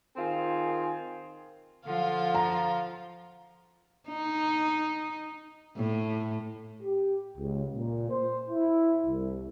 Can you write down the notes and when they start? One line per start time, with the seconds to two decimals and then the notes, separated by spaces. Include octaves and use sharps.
0.17 D#3 C4 F4 G#4
1.86 D3 F3 F4 F5
2.35 A#5
4.08 D#4
5.76 A2
6.83 G4
7.37 C#2
7.75 A#2
8.10 C5
8.50 E4
9.07 C2